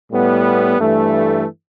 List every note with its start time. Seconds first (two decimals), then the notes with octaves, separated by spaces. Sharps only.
0.12 A2 G3 B3
0.79 G2 E3 A3